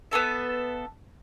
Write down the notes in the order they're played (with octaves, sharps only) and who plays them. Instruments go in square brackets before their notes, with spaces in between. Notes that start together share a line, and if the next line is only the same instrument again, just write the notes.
[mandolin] B3 C#4 A4 E5